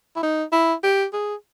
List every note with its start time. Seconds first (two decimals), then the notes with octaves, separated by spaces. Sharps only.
0.16 E4
0.23 D#4
0.52 E4
0.84 G4
1.13 G#4